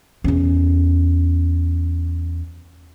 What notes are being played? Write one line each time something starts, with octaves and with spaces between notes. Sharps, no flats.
E2 C#4